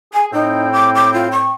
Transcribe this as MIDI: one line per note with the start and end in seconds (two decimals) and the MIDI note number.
0.13 0.29 68
0.13 0.25 80
0.32 1.53 45
0.32 1.53 60
0.32 0.71 63
0.32 1.53 79
0.72 0.89 86
0.94 1.12 86
1.13 1.27 65
1.31 1.50 85